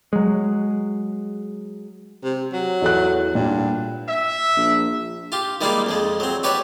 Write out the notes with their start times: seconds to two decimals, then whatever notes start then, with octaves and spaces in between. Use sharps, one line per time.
0.13 F#3 G#3
2.24 C3
2.53 F#3
2.82 E2 A4 F#6
3.35 G2 A#2
4.09 E5
4.57 A#1
5.32 F4 G4
5.61 D#3 G3 G#3 A#3 D#4 F4
5.86 F2 F3 G#3
6.20 F#3 C4
6.43 F#4 G4 B4 C#5 D5 F#5